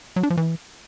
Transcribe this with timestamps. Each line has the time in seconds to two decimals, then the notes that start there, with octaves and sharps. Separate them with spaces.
0.16 F#3
0.23 D4
0.30 F3
0.37 E3